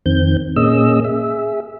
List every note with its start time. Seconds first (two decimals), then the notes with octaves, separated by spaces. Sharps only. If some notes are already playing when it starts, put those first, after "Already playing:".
0.06 F2 D#3 C4 G6
0.56 A#2 A#3 C#4 G#4 D#5 E6
1.05 G#4 E5